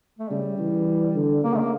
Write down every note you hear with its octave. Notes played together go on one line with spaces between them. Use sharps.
A3
C#3 G3
E3
D3
C#3 A#3
A3
A#3